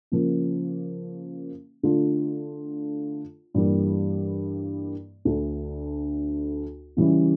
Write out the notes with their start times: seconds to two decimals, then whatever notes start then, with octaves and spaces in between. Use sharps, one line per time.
0.12 C#3 F3 A#3
1.83 D3 A3 D4 F4
3.54 G2 E3 G3 A#3
5.25 D2 D3 A3
6.97 C#3 E3 G3 C#4 E4